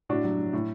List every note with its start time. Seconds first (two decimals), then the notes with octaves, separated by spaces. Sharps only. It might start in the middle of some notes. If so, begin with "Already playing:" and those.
0.09 A2 D4 F#4
0.24 F#3
0.38 A2
0.53 A2